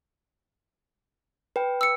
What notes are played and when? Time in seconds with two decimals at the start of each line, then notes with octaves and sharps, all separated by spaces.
1.56 B4 G5
1.81 E6 C#7